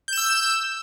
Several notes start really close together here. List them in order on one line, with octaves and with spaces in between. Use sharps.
G6 E7 E6